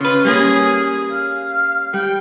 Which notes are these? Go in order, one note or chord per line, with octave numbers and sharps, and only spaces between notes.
C#3 F4 B4
G3 A#3 C#4 G#4
F5
G3 G5